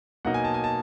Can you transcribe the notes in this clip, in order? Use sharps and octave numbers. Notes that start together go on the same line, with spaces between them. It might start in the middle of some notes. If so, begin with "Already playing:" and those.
B2 F#3 A#3 D#4 F#5
G#5
A5
G#5
A5